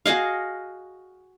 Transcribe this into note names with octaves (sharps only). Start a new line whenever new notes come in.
F#4 G#4 D#5 F5